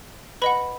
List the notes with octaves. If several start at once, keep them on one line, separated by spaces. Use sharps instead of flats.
B4 D#5 F#5 B5